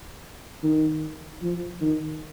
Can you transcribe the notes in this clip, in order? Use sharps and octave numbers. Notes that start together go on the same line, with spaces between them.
D#3
F3
D#3